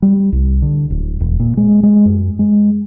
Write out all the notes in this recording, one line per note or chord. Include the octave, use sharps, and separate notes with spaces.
G3
C2
D3
D1
E1
A#2
G#3
G#3
F#2
G#3